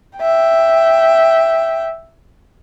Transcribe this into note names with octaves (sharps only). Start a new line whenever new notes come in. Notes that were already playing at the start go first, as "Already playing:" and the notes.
E5 G5